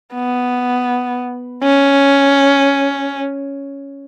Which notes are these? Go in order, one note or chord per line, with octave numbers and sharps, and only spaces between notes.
B3
C#4